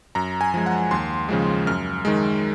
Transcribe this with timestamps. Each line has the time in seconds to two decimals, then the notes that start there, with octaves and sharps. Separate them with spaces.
0.15 F#2 A#5
0.41 G#5
0.54 F3 G#3
0.66 F#5
0.91 D#2 C6
1.29 C#3 F3 G#3
1.67 F#2 F6
2.05 D#3 G#3